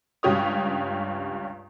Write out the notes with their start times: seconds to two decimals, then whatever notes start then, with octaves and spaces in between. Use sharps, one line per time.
0.23 C#2 G2 C#4 G4 C#5 D#6